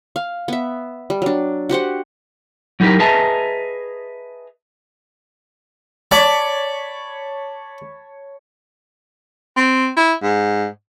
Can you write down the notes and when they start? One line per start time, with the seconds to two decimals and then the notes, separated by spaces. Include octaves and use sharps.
0.16 F5
0.48 B3 E5
1.10 G3
1.22 F#3 D4
1.69 F#4 G4 C5 F#5
2.80 F#3 D#4 E4 F#4 G4 A#4
2.99 G#4 B4 D#5 E5 A5 A#5
6.11 C#5 D5 A5 B5
9.57 C4
9.97 E4
10.23 G#2